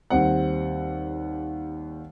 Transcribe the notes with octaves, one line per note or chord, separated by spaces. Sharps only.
D#2 G3 C4 F#5